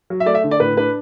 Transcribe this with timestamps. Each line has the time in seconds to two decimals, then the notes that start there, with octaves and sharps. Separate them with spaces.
0.10 F#3
0.20 E5
0.26 A3 D5
0.35 E5
0.44 D3
0.51 D5
0.60 A2 B4
0.77 D4 B4